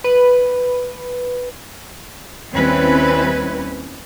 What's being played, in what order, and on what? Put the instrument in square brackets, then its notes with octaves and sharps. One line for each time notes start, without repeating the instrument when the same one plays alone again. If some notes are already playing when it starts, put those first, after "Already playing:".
[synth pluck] B4
[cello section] D#2 G3 C4 C#4 E4 B4